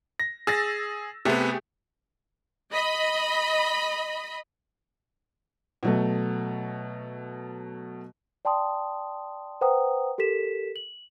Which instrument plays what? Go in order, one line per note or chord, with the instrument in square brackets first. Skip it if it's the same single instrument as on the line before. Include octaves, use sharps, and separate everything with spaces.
[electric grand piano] A#6
[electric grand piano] G#4 [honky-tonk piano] E6 A6 A#6
[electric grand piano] C3 B3 [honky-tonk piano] A3 G4 G#4
[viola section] D#5 B5
[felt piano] B2 F#3 A3
[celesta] D5 G5 A5 C6 D#6
B4 C5 F#5 G5 A#5 D#6
G4 A4 A#4 B6 E7
F#7